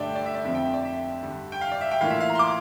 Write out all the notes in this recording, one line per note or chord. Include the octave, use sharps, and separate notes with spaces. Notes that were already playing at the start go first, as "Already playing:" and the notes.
Already playing: G2 D3 A3 D5 E5 G5
D5
E5
D5
F2 D3 F3 C4 E5
G5
E5
D5
E5
G2 D3 G3
G5
F5
D5
E5
G5
A2 E3 A#3 F4 F5
E5
F5
A#5
C6
D6